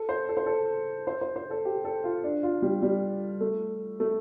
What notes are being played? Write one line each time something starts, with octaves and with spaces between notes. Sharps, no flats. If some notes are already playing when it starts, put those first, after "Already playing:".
Already playing: A4
C5
A4
C5
A4
C5
C5
C5
A4
G4
A4
F4
D4
F4
G3
G3
A3
A3